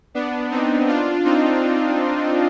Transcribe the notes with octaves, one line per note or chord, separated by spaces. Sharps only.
B3 D4
C4 D#4
D4 F4
C4 D#4